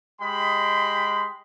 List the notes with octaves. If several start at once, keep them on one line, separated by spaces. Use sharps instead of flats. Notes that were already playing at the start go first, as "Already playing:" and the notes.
G#3 G4 D#5 G5 B5 C6